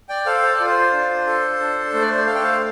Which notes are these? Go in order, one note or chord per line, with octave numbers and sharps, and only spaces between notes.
D5 G5
A4 C5 F5
C5
D5
F4
C5
D4
A4
D4
A3 C5
D5
C5
A4 F5
G5
C5 F5